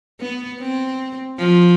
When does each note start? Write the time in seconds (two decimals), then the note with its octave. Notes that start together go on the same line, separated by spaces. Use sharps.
0.20 B3
0.60 C4
1.39 F3